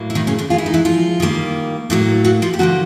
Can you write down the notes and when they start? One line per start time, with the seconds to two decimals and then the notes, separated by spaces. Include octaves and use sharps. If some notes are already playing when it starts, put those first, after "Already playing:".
Already playing: A2 F#3 A#3
0.10 E4
0.15 D#3 D#4
0.27 C#3 C#4
0.39 D3 D4
0.50 D#3 G#3 F4
0.58 E4
0.66 D#4
0.74 E3 E4
0.85 F3 F4
1.20 D#3 G3 A#3
1.90 A2 F#3 A#3
2.24 F#3 F#4
2.42 F3 F4
2.54 G4
2.59 D3 F3 F#3 A#3 F#4